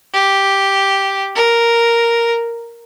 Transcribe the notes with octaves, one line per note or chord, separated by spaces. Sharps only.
G4
A#4